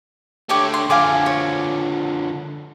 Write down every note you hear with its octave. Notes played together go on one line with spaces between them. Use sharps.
D3 A3 G4 C#5 D6
C6
D3 F3 F5 G#5 D6
C#5